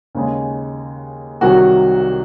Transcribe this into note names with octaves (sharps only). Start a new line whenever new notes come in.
D#2 C#3 G#3
C2 C3 D#3 F#3 F#4